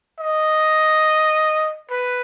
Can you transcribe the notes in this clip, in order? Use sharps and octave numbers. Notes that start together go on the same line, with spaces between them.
D#5
B4